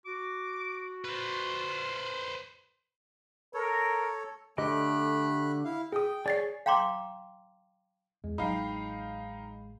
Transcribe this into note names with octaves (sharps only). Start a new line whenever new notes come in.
F#4 D6
F4 B4 C5
A4 A#4 C#5
D3 A3 G4 D#5 B5 F#6
E4 F5
G#4 G5 D#6
G#4 C#5 D5 A6 C7
F5 G5 A#5 C6 D6
E2 G#3
A1 F#3 D#4 F5 G5 B5 C7